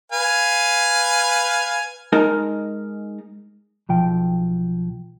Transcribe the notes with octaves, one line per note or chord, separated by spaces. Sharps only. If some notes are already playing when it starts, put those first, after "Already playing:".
B4 F5 G#5
G#3 D#4 A#4 A5
B1 F3 G5